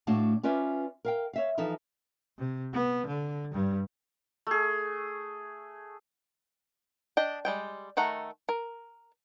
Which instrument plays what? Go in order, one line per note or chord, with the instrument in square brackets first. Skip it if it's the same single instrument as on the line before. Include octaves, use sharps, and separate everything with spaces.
[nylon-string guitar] A2 A3 D4 F#4 F5 A5
C#4 F4 B4 D5 E5
A#4 F5 G5
C#5 E5 F5
E3 F3 D#4 A4 E5
[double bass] C3
B3
D3
G2 G3
[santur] A3 G#4
[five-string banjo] D4 D#5 G5
G3 G#3 G5
D#3 A3 F#5 A#5
A#4